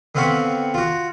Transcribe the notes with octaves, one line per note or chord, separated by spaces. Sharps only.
D3 B3 C4 F5 B5 C#6
F4 F#4